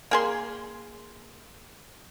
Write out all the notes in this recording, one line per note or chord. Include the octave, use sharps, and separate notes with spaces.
A#3 G#4 C6